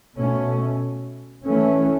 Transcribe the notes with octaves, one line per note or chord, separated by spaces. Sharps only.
B2 A3 C#4
E3 A3 C#4